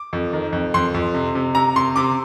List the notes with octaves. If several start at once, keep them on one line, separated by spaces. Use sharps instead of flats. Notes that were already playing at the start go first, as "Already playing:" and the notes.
Already playing: D6
F2
D#3
F2
F2 C6
F2
C3
C3
C3 A#5
C3 C6
C3 D6